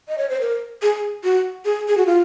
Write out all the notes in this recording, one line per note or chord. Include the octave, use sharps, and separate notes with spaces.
D#5
C#5
C5
A#4
G#4
F#4
G#4
G#4
F#4
F4